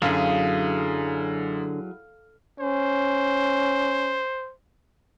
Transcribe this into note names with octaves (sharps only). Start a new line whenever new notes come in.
F#2 D3 F#3 E4 G#4 F5
C#4 C5